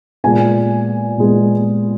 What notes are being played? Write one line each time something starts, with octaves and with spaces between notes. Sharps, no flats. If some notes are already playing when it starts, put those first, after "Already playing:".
A#2 G#3 B3 G#5
A#2 G#3 B3